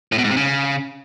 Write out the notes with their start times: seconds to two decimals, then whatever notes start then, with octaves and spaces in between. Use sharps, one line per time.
0.12 A2
0.18 B2
0.24 G#2
0.30 C3
0.37 C#3